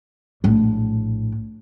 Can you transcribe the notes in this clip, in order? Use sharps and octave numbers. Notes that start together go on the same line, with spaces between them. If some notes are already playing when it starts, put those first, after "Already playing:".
A#1 A2